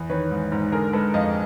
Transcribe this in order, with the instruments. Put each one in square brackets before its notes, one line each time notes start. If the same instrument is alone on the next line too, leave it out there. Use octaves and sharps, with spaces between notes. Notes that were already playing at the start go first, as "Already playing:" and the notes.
Already playing: [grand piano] E2
D#3 B4 C#5
G#2
G#2
D3 G#4 A#4
G#3 A4 B4
F2 D#5 F5